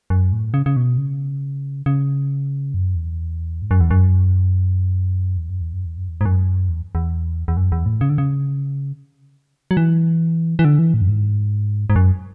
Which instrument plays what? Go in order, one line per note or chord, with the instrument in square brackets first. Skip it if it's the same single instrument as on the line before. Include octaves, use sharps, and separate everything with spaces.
[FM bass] F#2
A2
C#3
C#3
B2
C#3
C#3
F#2
E2
G#2
F#2
E2
F#2
E2
F#2
E2
F#2
E2
F#2
E2
G#2
F#2
E2
E2
E2
F#2
E2
A2
C#3
D3
C#3
F#3
E3
E3
D3
E3
A2
F#2
G#2
G#2
F#2